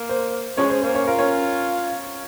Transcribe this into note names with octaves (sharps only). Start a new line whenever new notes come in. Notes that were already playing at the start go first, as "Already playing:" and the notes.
Already playing: A#3
C5
C#3 F3 G#3 C#4 C#5
C5
A#3 C5
C#4 C#5
F4 A#4
C#4 C#5